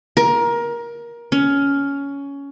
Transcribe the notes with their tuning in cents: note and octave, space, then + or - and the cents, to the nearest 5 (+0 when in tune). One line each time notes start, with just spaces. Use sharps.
A#4 +20
C#4 +15